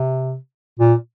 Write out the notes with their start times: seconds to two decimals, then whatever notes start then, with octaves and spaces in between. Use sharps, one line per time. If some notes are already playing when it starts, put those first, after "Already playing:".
Already playing: C3
0.79 A#2